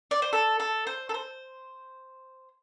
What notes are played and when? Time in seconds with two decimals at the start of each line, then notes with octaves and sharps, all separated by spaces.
0.11 D5
0.22 C5
0.33 A4
0.60 A4
0.87 C5
1.09 A4
1.14 C5